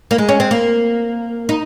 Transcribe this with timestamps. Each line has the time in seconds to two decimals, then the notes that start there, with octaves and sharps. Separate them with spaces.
0.11 A#3
0.18 G#3
0.29 C#4
0.40 C4
0.51 A#3
1.49 D#4